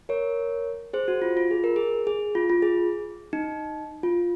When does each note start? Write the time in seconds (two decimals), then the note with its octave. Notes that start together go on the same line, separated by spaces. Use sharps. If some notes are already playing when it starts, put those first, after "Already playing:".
0.09 A#4 C#5
0.93 G#4 C5
1.08 F#4
1.22 F4
1.37 F4
1.51 G#4
1.64 A#4
1.76 G#4
2.07 G#4
2.35 F4
2.50 F4
2.62 G#4
3.33 D#4
4.03 F4